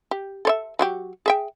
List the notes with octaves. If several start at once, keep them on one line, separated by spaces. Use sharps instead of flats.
G4
A4 C#5 E5
F#3 F#4 G4
G#4 E5 G5